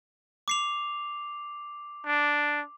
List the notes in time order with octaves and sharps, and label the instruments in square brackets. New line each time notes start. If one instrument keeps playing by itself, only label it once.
[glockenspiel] D6 C7 F7
[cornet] D4